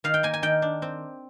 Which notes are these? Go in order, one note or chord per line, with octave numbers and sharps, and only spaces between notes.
D#3 F5
G5
A#3 G#5
G#5
D#3 G5
D4
C4